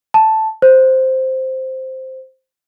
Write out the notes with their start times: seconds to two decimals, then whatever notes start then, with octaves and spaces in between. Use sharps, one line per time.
0.14 A5
0.62 C5